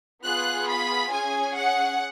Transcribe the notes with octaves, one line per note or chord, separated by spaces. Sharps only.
B3 F4 G#4 F#6
B5
C#4 G#4 G#5
F#5